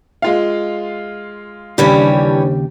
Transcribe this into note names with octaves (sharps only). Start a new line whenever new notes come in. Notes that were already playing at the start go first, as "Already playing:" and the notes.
G#3 F4 F5
D#2 C#3 E3 G3 C#4 D4 G4